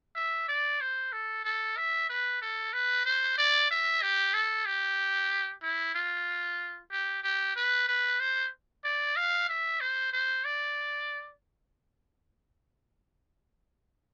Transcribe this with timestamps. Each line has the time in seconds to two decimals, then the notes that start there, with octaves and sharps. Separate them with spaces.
0.16 E5
0.48 D5
0.81 C5
1.12 A4
1.45 A4
1.77 E5
2.10 B4
2.42 A4
2.73 B4
3.05 C5
3.38 D5
3.71 E5
4.02 G4
4.34 A4
4.66 G4
5.63 E4
5.95 F4
6.91 G4
7.23 G4
7.56 B4
7.88 B4
8.20 C5
8.84 D5
9.16 F5
9.49 E5
9.81 C5
10.12 C5
10.45 D5